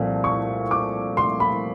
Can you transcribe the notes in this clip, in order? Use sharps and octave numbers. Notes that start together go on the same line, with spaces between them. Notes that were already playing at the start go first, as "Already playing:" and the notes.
Already playing: C2 A#2 F3 A3 C4
C#6
D6
C6
B5